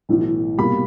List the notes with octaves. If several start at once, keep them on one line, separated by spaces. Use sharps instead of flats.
B1 A2 E3
C2 B2 G3 A#3 B5